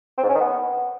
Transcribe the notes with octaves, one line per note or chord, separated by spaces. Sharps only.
C4
G#2
C#4
D#3
B3